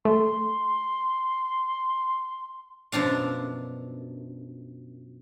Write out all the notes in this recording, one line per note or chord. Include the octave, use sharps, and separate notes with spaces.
A3 C6
F#2 B2 F3 D4 F5